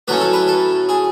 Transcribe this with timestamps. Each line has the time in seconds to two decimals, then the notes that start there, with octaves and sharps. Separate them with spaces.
0.08 A2 F#3 A3 C#4 B4
0.20 A4
0.33 B4
0.48 A4
0.89 G#4